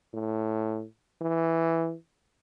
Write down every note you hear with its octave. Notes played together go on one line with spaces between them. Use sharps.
A2
E3